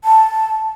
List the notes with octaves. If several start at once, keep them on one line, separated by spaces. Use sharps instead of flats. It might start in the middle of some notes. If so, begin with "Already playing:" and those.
A5